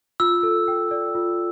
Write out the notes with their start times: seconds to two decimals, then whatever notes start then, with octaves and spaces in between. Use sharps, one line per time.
0.20 F4 E6
0.43 A4
0.68 G5
0.91 D5
1.15 F4